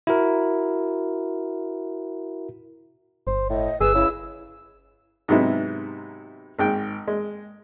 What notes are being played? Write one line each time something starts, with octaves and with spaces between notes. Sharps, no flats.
E4 F#4 A#4
G1 C5
A2 D#5
G1 G#4 B4 E6
C#3 E4
G#2 C3 F#3 B3 D#4 E4
G#1 G#2 G5
G#3